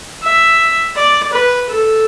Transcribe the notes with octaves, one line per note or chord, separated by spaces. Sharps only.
E5
D5
B4
A4